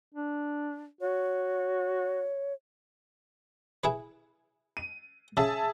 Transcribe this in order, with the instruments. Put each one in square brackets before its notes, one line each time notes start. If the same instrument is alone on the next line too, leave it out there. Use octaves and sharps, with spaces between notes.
[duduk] D4
[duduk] F#4 [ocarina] C#5
[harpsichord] E4 G#4 B4
[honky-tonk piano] D#7
[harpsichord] C#3 [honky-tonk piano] G#4 E5 A5